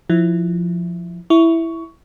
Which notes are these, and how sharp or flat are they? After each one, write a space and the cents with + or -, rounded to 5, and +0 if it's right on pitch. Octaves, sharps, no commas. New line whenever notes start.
F3 +0 E4 +0
E4 +0 C#6 +15